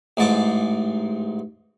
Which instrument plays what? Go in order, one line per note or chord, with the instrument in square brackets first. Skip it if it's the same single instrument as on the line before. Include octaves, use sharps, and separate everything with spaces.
[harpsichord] A1 G#2 A5 D6